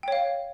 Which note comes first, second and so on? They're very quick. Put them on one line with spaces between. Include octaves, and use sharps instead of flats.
G5 C#5 F5